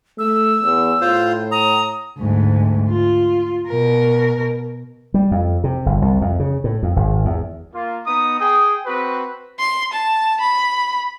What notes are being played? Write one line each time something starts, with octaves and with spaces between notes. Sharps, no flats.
A3 E6
E2
A2 F4 C5
A#5 D#6
D2 G#2
F4
B2 A#4
G3
F2
C3
G1
C2
F2
C#3
A2
F2
G#1
E2
A#3 F4
B3 D#4 A#5 D#6
G#4 G5 D#6
C4 F#4 B4
C6
A5
B5